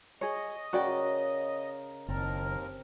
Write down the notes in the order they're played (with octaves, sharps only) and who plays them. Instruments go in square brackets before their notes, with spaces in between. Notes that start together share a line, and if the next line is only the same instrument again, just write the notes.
[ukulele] G#4 C#5 [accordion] D#5
[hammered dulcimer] C#3 A#4 [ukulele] F#4 D5 G5
[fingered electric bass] F#1 [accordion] D#2 A#4 [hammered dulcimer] C4 A5